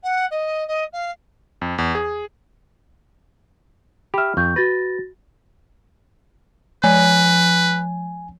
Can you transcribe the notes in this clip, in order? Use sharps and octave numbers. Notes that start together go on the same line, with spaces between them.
F#5
D#5
D#5
F5
F2
E2
G#4
G4 E5 B5 F6
F2 C#6 G6
F#4 B4 A6 A#6
F3 B4 G#5